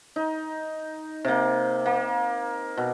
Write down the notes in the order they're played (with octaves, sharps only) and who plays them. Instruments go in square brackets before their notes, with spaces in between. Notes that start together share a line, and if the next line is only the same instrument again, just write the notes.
[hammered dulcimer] D#4
C3 A#3
A#3
B2